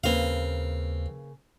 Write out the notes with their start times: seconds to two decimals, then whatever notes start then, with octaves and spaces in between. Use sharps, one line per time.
0.04 D#2 C#3 A#3 C4 B4 F5